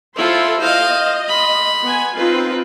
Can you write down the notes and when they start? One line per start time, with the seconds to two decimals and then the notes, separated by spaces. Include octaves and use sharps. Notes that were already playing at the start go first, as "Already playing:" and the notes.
0.16 E4 F4 A4 C5 C6
0.60 C5 D#5 F5
1.28 B5 C6
1.83 B3 G#5
2.17 C4 D#4 F4 B4